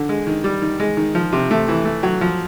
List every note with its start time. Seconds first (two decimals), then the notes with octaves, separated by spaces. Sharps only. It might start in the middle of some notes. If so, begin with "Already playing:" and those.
Already playing: D3
0.09 G#3
0.27 D#3
0.44 G3
0.62 D#3
0.80 G#3
0.97 D#3
1.15 F3
1.33 C3
1.51 A3
1.68 E3
1.85 A3
2.03 F#3
2.21 F3